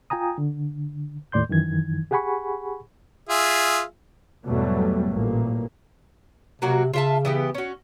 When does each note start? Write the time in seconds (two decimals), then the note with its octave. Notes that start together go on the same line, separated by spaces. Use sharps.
0.10 F4 G5 G#5 A#5 D#6
0.38 D3
1.32 D#2 A2 D5 C6 G6
1.49 F#2 D#3 E3 G#6
2.11 G4 G#4 F#5 G#5 B5 C#6
3.29 F4 G#4 E5
4.45 E2 G#2 B2 F#3 G3 A3
5.11 A1 A#2 A#3
6.62 C3 F#3 A#3 F#4
6.94 C#3 F4 E5 A5
7.25 E3 B3 G4
7.55 C#4 F#4